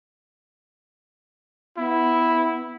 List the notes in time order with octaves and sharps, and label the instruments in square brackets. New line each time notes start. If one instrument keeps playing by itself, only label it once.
[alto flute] B3 [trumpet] E4